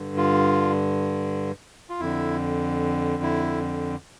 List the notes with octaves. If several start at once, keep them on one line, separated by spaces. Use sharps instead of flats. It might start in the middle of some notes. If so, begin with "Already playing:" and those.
Already playing: G2 D3
F4
F4
F2 D3 E4
E4